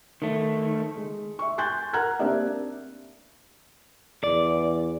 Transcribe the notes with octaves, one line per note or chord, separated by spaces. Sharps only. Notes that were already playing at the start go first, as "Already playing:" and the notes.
D#3 A3
G#3
E5 C#6
G#5 C6 F#6 G6 A6
A#4 F#5 A#5 F6 F#6 G#6
A#3 C4 D4 G4 D5 E5
E2 D5